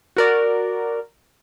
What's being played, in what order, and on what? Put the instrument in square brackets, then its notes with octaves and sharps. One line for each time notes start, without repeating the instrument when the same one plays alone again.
[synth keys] F#4 A#4 D5